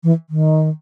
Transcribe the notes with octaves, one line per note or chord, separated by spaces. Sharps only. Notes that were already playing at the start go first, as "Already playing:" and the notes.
E3
D#3